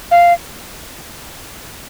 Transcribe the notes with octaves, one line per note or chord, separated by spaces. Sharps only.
F5